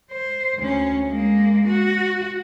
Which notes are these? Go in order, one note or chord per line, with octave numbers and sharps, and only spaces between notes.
C5
D2 C#4
G#3 A#3
F#4